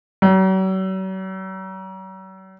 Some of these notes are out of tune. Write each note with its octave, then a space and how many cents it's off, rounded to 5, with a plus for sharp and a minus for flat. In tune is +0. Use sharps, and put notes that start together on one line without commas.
F#3 +40